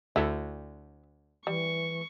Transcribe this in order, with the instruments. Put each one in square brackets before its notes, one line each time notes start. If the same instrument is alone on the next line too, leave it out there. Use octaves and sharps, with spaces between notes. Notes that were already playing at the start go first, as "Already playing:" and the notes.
[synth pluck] D2 [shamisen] E4 A4 E5
[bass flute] E3 [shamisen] G3 [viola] C#6